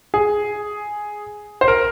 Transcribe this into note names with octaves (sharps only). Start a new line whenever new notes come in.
G#4
C5
A#4